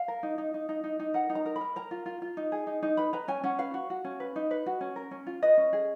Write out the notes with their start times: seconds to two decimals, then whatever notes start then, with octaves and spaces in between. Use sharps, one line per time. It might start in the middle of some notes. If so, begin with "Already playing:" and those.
Already playing: F5
0.08 A#4
0.23 D#4
0.38 D#4
0.54 D#4
0.69 D#4
0.84 D#4
0.99 D#4
1.14 A#4 F#5
1.30 D#4
1.35 A#5
1.46 A#4
1.56 B5
1.61 A#4
1.76 A#4 A#5
1.91 F4
2.06 F4
2.22 F4
2.37 D#4
2.52 G#4
2.67 D#4
2.83 D#4
2.97 B4 B5
3.13 B4 A#5
3.28 C#4 G#5
3.44 C#4 F#5
3.58 B4 F5
3.74 F#4
3.90 F#4
4.04 C#4
4.20 B4
4.36 D#4
4.51 B4
4.66 F#4
4.81 C#4
4.96 A#4
5.11 C#4
5.27 F4
5.42 B4 D#5
5.57 C#4
5.73 G#4